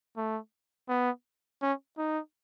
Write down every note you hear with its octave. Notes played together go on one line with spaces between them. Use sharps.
A3
B3
C#4
D#4